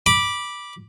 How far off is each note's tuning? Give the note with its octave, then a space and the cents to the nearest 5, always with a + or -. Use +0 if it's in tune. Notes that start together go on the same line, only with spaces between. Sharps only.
B5 -15 D6 +0